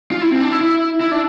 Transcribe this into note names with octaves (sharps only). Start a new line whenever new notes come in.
F4
E4
C4
D4
E4
E4
E4
D4